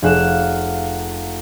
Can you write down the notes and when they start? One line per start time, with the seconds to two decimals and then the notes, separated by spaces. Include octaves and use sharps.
0.02 F1 G#4 F5 F#5 E7